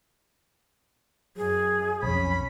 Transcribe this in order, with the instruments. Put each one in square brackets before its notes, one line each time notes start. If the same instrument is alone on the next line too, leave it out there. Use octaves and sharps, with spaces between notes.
[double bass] F#2 [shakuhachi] G#4
[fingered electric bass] B1 F2 [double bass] C#4 [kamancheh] B5